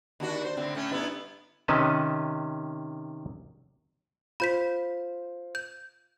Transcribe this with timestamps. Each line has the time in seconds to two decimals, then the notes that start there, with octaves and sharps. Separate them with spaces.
0.20 D#2 D4 F#4
0.45 C5
0.57 A2 D3 C4
0.75 A2 A3 C#4
0.91 G2 B3 E4
1.68 C3 D#3 C#4 B4 D#5 A5
4.40 F4 C5 B5 G6 B6
5.55 G6